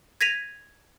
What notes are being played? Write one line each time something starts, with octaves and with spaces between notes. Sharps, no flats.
G#6 A#6 B6 D#7 F7